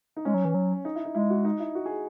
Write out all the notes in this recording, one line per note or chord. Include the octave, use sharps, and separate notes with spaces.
D#4
G#3 C#4
F#3
E3
F#3
D#4
E4
D#4
G#3 E4
F#4
D#4
E4
F#4
G#4